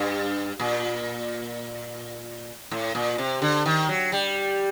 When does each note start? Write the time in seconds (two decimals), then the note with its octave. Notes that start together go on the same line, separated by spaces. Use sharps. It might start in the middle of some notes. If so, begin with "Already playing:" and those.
Already playing: G2
0.60 A#2
2.71 A2
2.95 A#2
3.18 C3
3.42 D3
3.66 D#3
3.89 F#3
4.12 G3